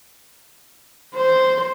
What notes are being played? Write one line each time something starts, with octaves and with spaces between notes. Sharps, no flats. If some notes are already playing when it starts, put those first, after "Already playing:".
C5